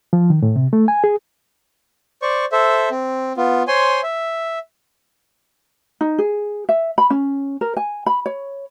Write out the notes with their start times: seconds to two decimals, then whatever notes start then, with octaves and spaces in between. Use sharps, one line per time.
0.13 F3
0.30 D#3
0.42 A2
0.56 C3
0.73 A3
0.88 G#5
1.04 G#4
2.22 C5 D5 C#6
2.52 A4 C5 E5
2.91 C4
3.37 B3 F4
3.68 C5 C#5 G#5 C6
4.03 E5
6.01 D#4
6.18 G#4
6.69 E5
6.98 B5
7.10 C#4
7.61 A#4
7.77 G#5
8.06 B5
8.26 C#5